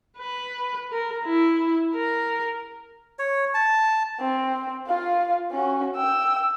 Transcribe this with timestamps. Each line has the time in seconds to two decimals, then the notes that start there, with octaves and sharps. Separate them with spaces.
0.18 B4
0.92 A#4
1.25 E4
1.94 A#4
3.19 C#5
3.54 A5
4.20 C4
4.87 F4 F5
5.52 C#4 F#4
5.96 G5 E6